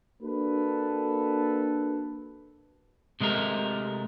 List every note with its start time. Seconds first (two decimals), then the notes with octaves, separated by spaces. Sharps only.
0.23 A#3 D4 F#4 A4 B4
3.21 C3 G#3 A3 A#4